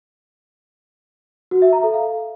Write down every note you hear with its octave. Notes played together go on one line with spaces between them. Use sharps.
F#4
E5
A#5
A4
F5